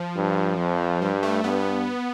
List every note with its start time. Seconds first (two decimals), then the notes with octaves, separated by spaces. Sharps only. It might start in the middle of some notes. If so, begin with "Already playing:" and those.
Already playing: F3
0.16 G2
0.58 F2
1.02 G2 G3
1.23 A3
1.43 G2 B3